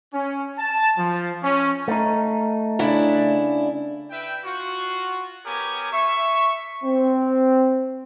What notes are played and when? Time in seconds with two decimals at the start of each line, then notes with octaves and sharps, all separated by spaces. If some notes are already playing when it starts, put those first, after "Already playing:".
0.14 C#4
0.58 A5
0.98 F3
1.43 C#4
1.88 A3 D#4
2.79 C#3 D4 E4
4.11 B4 E5 G5
4.44 F4 F#4
5.46 B3 G4 A#4 C#5 G#5
5.92 E5 C#6
6.84 C4